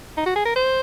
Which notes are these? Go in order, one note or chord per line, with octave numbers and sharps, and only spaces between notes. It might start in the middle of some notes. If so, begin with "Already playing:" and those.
D#4
F#4
G#4
A#4
C5